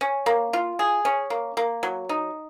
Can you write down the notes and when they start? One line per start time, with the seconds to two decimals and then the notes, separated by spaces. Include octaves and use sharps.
0.01 C#4
0.26 A#3
0.53 F4
0.79 G#4
1.05 C#4
1.30 A#3
1.57 A#3
1.83 F#3
2.09 D#4